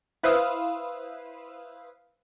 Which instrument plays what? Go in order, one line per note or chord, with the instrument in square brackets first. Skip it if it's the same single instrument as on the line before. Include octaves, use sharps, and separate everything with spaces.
[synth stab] E4 B4 C5 F5 D#6 E6